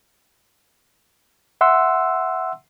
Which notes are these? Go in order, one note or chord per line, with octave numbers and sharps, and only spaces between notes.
E5 F#5 C6 E6